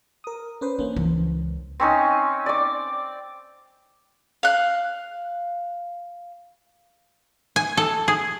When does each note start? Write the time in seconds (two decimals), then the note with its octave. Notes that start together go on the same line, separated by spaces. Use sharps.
0.24 A#4 D#6
0.61 C#4 B4 C5
0.79 A#3 C#4 D4
0.96 C#2 E3
1.80 C4 C#4 D#4
2.46 D5 D6
4.43 F5 F#6
7.56 G#5
7.77 A4
8.08 G#4